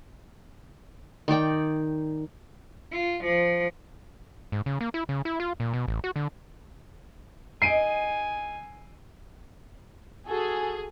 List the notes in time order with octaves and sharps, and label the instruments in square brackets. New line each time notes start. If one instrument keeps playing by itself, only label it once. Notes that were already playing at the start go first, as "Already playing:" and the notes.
[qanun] D#3 D#4 D5 G5
[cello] F4
F3
[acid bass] G#2
C#3
A#3
E4
C#3
E4
F4
A#2
B2
A1
F#4
D3
[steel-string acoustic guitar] D#4 G#4 D#5 [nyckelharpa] G#5 [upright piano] C7 D7 D#7
[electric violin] F#4 A4 [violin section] G#4